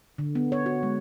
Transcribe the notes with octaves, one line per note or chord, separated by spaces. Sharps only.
D3
B3
C#5
F#4
G#3